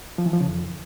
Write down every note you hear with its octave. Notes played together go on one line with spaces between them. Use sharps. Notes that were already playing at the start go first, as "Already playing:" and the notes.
F3
E3
F3
C#3
F2